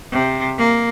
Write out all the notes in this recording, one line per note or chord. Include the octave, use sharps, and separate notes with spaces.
C3
A#3